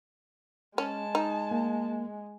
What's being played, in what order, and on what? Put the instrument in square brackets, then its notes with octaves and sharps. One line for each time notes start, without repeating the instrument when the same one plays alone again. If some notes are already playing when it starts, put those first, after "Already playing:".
[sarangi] G#3 [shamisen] C#4 [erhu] A5
[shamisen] D#4
[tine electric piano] A#3